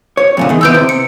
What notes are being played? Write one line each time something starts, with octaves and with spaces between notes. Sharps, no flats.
C#5
F2 A#2 D3
E2 D#3
D#2 E3 B3 E6 G6 D7
C3
C#7